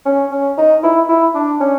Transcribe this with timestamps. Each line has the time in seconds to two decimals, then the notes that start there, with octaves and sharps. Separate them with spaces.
0.05 C#4
0.31 C#4
0.57 D#4
0.83 E4
1.09 E4
1.35 D4
1.60 C#4